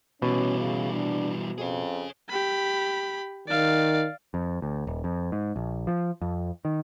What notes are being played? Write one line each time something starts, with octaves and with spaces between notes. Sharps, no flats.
B2 E3 G3 C#4
C#3
D4
F2 G#4 C#5
G4 B5
D#3 D5 F5
F2
D2
D#1
F2
G#2
A#1
F3
F2
D#3